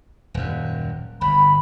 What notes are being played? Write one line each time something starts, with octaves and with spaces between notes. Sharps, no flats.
D#1 F#2
G1 B5